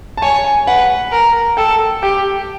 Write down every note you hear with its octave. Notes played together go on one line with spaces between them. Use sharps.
A5
C#5 G#5
G#5
B4 F#5
A#4
A4 G5
G4 G5